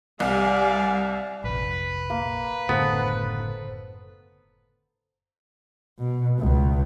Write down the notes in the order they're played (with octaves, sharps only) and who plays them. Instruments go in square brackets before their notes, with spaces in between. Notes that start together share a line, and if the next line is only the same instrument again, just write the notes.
[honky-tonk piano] C2 [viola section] G3 F5 [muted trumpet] D5 [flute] G#5
[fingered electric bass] F1 A#1 [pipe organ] B4
[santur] A#3
[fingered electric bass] F#1 A2 D3 [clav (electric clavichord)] B3 [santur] A4 C5
[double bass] B2
C#2